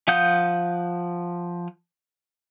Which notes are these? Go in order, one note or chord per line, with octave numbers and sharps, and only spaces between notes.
F3 F5 F#5 D#6 G6